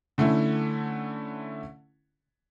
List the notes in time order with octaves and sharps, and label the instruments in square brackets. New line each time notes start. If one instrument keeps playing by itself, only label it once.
[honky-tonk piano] D3 A3 C#4 E4